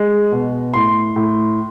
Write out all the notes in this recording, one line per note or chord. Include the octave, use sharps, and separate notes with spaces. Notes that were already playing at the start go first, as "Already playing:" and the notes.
Already playing: G#3
B2
A2 C6
A2